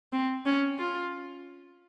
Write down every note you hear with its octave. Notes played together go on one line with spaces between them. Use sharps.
C4
C#4
F4